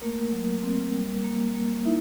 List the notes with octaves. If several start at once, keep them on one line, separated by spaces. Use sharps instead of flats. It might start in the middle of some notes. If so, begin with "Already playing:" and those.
A3 A#3 A#4
F#3
C4
G3
A#3
A#3
D#4 E4 E5